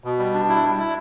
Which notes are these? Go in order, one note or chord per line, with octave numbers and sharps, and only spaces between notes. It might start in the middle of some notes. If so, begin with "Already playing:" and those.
B2
G3
D4
E4
G3
E4